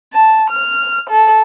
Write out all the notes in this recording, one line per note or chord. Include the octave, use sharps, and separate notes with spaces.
A5
F6
A4